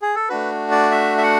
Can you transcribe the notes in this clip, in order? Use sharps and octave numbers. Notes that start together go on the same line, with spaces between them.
G#4
A4
A3 D4 F#4 B4
D5
E5
E5
F#5